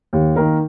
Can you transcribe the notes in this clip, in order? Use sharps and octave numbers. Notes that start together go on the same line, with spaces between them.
D#2
D#3 A#3 D#4 A#4